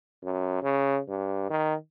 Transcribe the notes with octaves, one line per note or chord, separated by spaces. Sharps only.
F#2
C#3
G2
D#3